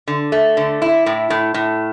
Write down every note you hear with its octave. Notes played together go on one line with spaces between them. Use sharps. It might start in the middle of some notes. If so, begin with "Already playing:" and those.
D3
A3
D3
E4
A2
A2
A2